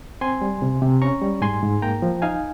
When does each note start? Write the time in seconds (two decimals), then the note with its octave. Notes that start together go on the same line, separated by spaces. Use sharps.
0.21 C4 G#5 C6
0.42 G3
0.62 C3
0.82 C3
1.02 C#4 A#5 C#6
1.22 G3
1.41 G#2 G#5 C6
1.62 G#2
1.82 A#3 G5 A#5
2.02 F3
2.22 D#4 F5 G#5